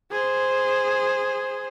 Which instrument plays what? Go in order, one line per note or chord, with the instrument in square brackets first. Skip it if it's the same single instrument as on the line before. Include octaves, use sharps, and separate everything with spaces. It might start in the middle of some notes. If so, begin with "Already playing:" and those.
[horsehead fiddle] G#4 C5